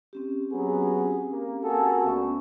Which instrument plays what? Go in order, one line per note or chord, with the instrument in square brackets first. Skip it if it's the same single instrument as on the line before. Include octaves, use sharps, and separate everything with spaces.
[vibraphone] C4 C#4 G4
[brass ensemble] F#3 B3 [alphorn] G#4
[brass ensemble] A#3
[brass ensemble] A#3 G#4 A4 [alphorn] F#4
[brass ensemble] D2 [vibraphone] B3 C#4 C#6